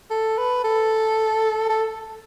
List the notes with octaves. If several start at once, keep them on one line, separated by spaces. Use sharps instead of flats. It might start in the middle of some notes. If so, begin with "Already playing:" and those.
A4
B4
A4
A4